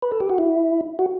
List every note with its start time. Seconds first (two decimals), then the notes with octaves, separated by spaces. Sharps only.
0.02 B4
0.12 A4
0.20 G4
0.30 F#4
0.38 E4
0.99 F#4